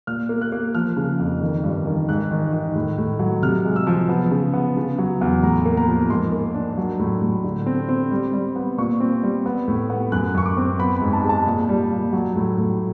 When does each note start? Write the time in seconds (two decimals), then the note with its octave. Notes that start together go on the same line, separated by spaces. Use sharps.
0.07 A#2 F6
0.29 A#3
0.42 F#6
0.52 A#3
0.75 F3 F6
0.97 C#3
1.19 F2
1.42 D#3
1.64 G2
1.86 D#3
2.08 G#2 F#6
2.31 D#3
2.53 D#3
2.75 A2
2.98 A2
3.19 F#3
3.42 C3 F6
3.65 G#3
3.76 E6
3.87 F3
4.09 B3
4.31 C#3
4.54 B3
4.77 C#3
4.99 F#3
5.21 E2
5.43 A2 A#5
5.66 A#3
5.77 A#5
5.88 F3
6.10 G#2 C6
6.32 A#3
6.54 D4
6.78 F#3
6.99 A2
7.21 A2
7.44 D3
7.66 C4
7.89 C4
8.11 G3
8.33 G3
8.56 B3
8.78 A#2 C#6
9.00 C4
9.23 G3
9.46 B3
9.68 A2
9.90 B3
10.12 F#2 F#6
10.34 F#2 C#6
10.46 D6
10.57 C4
10.79 B3 B5
10.96 G#2 B5
11.13 A5
11.24 G#3 A5
11.47 A#2
11.69 G3
11.91 A#2
12.13 F#3
12.36 A2
12.58 A2